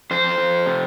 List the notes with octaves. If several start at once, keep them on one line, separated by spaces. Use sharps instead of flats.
F2 C5
F2
C3